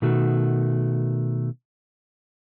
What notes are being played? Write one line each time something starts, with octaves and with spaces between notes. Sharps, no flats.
B2 D#3 A3 F#4